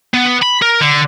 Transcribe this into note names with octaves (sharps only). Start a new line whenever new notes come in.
B3
B5
A#4
D3